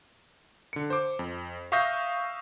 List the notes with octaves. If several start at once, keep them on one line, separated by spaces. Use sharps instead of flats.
D3 C#7
C5 D6
F2
E5 F5 C#6 D#6 G6 A#6